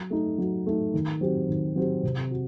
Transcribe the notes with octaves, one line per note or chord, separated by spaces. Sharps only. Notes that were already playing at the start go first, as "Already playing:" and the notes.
Already playing: F#3
A3 D#4
F#3
A3 D#4
D#3
F#3 C4 G4
D#3
F#3 C4 G4
C3
F#4